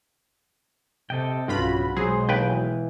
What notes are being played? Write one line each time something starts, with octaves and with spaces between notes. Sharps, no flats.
C3 A4 D#5 G5
B1 G2 C#3 F#3 F4 F#4 B5
B2 F#3 G#3 G#4 C5
D#2 E3 B4 G5 G6